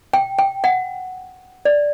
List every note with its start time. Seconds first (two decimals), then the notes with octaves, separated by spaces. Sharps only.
0.13 G5
0.38 G5
0.64 F#5
1.65 D5